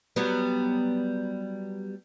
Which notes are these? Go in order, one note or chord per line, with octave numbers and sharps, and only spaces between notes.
F#3 G3 B3